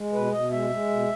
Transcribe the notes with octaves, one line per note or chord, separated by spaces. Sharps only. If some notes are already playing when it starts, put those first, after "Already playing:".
Already playing: G#3
B2 B4
B2 D#5
G#3 E5
G#3
B2